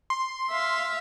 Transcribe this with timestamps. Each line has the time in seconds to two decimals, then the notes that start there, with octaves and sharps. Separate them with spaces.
0.10 C6
0.51 E5 F5